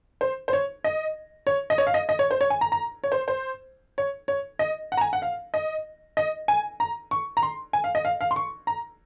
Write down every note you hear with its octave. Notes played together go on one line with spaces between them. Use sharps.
C5
C5
C#5
D#5
C#5
D#5
C#5
F5
D#5
D#5
C#5
C5
C#5
G#5
A#5
A#5
C#5
C5
C5
C#5
C#5
D#5
F#5
A#5
G#5
F#5
F5
D#5
D#5
G#5
A#5
C#6
A#5
C6
G#5
F5
D#5
F5
F5
C6
C#6
A#5